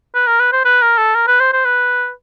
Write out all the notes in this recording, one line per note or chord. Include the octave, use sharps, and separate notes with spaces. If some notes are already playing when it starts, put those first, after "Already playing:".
B4
A#4
B4
C5
B4
A#4
A4
A#4
B4
C5
C5
B4